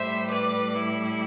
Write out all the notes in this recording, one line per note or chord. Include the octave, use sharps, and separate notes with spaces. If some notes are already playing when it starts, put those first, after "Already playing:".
Already playing: A2 G3 C5 E5
B4 D5
E4